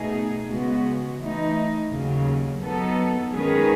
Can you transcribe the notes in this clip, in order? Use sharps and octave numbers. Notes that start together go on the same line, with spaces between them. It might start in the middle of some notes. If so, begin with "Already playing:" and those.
Already playing: B2 A3 D#4 G#4
C#3 G#3 B3 F#4
E3 A3 D#4
D#2 C#3 F#3
F#3 B3 D#4 A4
D#3 G#3 C#4 G#4 B4